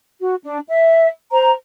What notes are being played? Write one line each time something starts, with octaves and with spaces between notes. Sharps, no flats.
F#4
D4
E5
C5 A#5